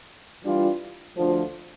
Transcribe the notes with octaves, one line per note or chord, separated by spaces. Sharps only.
E3 G3 D4 F4
D2 D3 F3